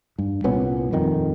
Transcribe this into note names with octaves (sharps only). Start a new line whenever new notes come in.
G2
C2 A#2 B3 C#4
D#1 F2 D#3